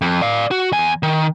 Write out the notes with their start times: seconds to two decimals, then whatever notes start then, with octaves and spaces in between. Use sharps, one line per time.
0.01 F2
0.21 D5 F5
0.51 F#4
0.72 E2 G#5
1.03 D#3